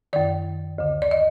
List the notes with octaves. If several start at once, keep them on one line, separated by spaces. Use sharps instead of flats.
F#2 D#3 D5
D2 D3
D5
D#5